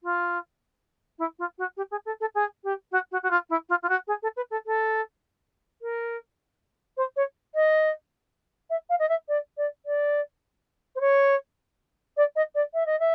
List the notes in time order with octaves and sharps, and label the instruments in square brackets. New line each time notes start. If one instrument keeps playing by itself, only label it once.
[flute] F4
E4
F4
F#4
G4
G#4
A4
A4
G#4
G4
F#4
F#4
F#4
F4
E4
F4
F4
F#4
G#4
A4
B4
A4
A4
A#4
C5
C#5
D#5
E5
F5
D#5
E5
D5
D5
D5
C5
C#5
D5
D#5
D5
E5
D#5
E5